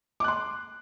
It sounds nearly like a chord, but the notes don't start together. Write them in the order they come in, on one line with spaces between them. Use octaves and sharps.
D6 F#6 C6